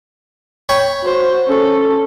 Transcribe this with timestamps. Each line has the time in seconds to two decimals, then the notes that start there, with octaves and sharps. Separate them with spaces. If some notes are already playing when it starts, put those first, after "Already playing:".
0.69 C#5 G5 B5
1.04 F#4 C5
1.47 C#4 A4